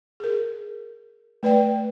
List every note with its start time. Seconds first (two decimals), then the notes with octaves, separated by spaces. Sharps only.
0.20 G#4 A#4
1.43 A3 B4 D5 G5